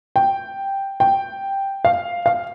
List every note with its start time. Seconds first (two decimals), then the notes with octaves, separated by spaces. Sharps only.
0.16 G5
1.00 G5
1.85 F5
2.26 F5